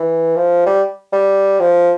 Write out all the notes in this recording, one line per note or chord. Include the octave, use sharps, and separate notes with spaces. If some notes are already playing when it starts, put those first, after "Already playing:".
Already playing: E3
F3
G3
G3
F3